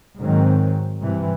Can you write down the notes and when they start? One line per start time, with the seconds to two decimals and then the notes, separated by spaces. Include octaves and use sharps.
0.19 G#2 D#3 F#3 C4
1.01 G2 C3 E3